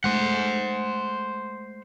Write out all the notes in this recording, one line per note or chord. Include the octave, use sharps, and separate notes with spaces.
G#3 A3 C5 F#5